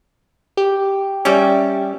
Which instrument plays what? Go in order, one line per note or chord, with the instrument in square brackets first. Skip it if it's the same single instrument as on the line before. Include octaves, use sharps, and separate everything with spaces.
[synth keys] G4
[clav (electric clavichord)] G3 C#4 [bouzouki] D5 E5 G5